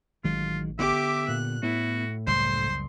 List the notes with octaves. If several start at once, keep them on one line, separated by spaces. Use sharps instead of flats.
A1 D#3 F#3 G#3 F4
D3 B3 G4 E5 D6
A#2 F#6
A2 B3 E4 F#4
F#1 C#2 G3 C5 C6